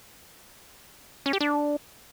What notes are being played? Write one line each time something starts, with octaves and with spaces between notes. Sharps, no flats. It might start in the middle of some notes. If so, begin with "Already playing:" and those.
C#4
G4
D4